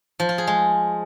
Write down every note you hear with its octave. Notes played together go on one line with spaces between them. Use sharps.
F3
F4
G#4
G#3